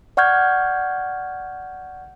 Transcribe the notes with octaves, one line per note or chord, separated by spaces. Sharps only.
D5 F#5 C#6 F6 G6 G#6